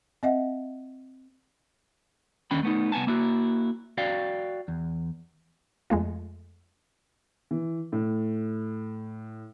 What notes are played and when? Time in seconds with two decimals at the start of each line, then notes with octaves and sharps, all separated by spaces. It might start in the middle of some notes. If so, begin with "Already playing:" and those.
0.23 C4 D#5 E5 F#5
2.51 D#2 D3 D#3 C#4 G5 B5
2.63 A3 B3 D#4
2.92 C2 B3 G#5 A5
3.07 A#3 E4 F#4
3.98 F#4 D5 F5 G5
4.68 E2
5.90 F2 G#3 A3 F4
7.51 E3
7.92 A2